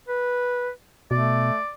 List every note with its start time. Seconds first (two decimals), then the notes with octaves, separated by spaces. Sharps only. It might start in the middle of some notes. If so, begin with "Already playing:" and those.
0.09 B4
1.11 B2 A3 D5